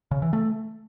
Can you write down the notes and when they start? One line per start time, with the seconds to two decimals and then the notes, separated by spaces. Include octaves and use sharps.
0.11 C#3
0.22 E3
0.33 A3